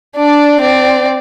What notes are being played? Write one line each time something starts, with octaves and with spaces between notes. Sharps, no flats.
D4 D5
C4 D5